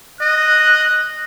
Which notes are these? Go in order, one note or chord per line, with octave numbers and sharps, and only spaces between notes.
D#5 F#6